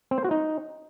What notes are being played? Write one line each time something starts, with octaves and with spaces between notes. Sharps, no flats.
C4
C5
F#4
D#4